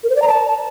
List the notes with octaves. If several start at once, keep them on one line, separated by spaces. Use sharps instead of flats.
A#4
C5
D5
A#5
A5